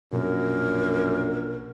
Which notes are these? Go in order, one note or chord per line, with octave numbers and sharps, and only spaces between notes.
A#1 F#2 B2 A#4